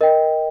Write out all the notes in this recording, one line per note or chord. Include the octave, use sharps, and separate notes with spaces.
A#4 D#5 G5